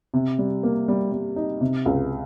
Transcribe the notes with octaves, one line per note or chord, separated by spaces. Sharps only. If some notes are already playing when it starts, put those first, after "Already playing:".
C3
G3
A#3
G3
G3
D#4
C3
C#2